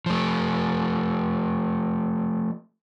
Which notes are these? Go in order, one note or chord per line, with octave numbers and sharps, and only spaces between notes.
F3 A3